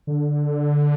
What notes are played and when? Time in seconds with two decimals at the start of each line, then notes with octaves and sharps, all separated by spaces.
0.07 D3